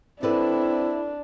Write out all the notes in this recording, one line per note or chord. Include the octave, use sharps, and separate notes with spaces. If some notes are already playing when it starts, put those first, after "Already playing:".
C4 D4 E4 A4 B4 D5